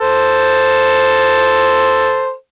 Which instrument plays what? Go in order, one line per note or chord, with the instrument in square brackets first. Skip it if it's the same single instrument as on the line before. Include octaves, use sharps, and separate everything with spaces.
[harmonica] A4 C5